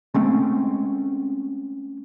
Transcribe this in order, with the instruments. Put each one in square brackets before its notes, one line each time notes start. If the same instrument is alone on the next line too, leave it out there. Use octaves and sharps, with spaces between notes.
[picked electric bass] G#3 A3 C4 C#4